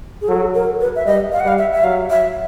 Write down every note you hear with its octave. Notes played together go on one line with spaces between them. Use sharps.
G#4
F#3 A4
A#4
B4
E5
G3 D#5
F5
F#5
G3 F5
E5
E5
F#3 F5
E5